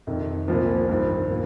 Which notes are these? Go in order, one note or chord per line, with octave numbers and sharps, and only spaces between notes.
F2 C3 D#3
C2 A#2 F3 C4
G2 D#3 C4
A#2